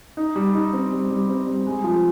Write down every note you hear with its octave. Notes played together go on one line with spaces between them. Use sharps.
D#4
G3
D#4
C4
G3
G3
C4
G3
G#3
F3